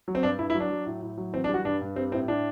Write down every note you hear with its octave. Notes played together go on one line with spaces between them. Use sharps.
F#3
C4
G2 D4
G2 E4
E4
F#3
D4
F#3
A2
A2
F#3
E3 C4
D4
G3
F#4
G2 D4
G2
G3 C4
A2 C4
A2 D4